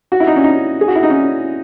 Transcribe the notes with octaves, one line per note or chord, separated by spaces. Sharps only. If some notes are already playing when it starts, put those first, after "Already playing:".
F#4
E4
D#4
C#4
D#4
G#4
F#4
E4
D#4
C#4